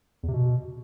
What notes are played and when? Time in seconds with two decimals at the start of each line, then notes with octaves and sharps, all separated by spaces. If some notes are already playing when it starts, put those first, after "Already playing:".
0.23 E2
0.28 C3
0.33 B2